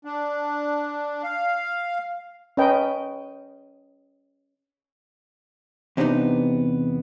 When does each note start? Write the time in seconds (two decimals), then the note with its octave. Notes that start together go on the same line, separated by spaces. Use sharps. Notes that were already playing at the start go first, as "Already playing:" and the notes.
0.05 D4
1.23 F5
2.57 C#4 A#4 B4 D#5 G5
5.97 E2 C3 B3 C4 D4 D#4